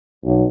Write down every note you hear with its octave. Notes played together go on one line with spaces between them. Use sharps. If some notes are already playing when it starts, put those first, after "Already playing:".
B1